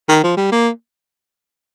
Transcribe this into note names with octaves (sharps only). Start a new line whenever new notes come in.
D#3
F3
G3
A#3